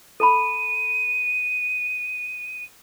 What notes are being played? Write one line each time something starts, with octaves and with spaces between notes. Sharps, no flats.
A4 A5 B5 D#7